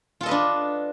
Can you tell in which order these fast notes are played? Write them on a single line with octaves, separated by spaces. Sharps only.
F4 A4 D#5 B4 D4